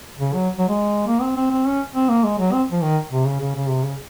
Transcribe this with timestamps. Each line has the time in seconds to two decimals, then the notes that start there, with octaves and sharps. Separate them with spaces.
0.19 C#3
0.34 F#3
0.59 F#3
0.69 G#3
1.08 A#3
1.22 C4
1.37 C4
1.51 C4
1.66 C#4
1.95 C4
2.09 A#3
2.24 G#3
2.39 F#3
2.53 C4
2.72 F3
2.83 D#3
3.12 C3
3.26 C#3
3.41 C#3
3.56 C#3
3.70 C3
3.84 C#3